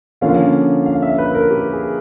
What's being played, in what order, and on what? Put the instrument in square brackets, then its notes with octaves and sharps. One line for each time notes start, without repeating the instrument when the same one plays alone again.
[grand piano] D3 F3 A#3 C#4 F4 F5
F5
E5
B4
A#4
G4
G#4